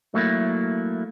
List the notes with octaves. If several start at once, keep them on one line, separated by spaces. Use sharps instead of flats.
F#3 A3 A#3 E4